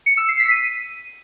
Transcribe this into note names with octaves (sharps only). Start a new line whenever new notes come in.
C#7
E6
C7
B6
D#7